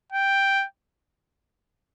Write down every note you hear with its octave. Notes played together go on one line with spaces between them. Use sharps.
G5